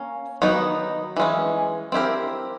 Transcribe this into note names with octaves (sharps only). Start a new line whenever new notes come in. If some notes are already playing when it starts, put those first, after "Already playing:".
Already playing: A#3 C#4
D#3 F#3 B3 D#4
E3 G#3 C#4
C4 E4 G4 A#4